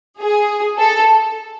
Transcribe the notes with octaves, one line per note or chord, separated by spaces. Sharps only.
G#4
A4